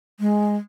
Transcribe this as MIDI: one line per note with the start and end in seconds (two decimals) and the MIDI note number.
0.20 0.55 56